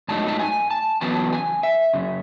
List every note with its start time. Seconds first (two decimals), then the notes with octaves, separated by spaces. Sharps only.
0.08 G#2 F#3 A3 D#4 A5
0.28 A5
0.39 G#5
0.71 A5
1.01 E2 C#3 F#3 B3 A5
1.33 G#5
1.63 E5
1.94 F#2 C#3